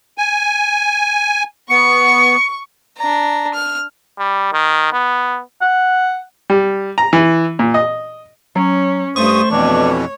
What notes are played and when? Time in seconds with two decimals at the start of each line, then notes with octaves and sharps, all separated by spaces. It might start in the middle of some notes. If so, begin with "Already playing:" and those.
0.18 G#5
1.70 B3 C#6 C#7
2.97 D4 A#5
3.54 F6
4.19 G3
4.53 D#3
4.93 B3
5.62 F#5
6.50 G3
6.98 A#5
7.13 E3
7.59 A#2
7.74 D#5
8.56 F#3 C#4
9.16 G2 A3 C5 C#6 D#6
9.51 F2 B2 E3 D4 C#5